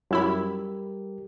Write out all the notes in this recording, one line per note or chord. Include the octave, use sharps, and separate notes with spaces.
F#2 G3 E4 G4 A#4 B5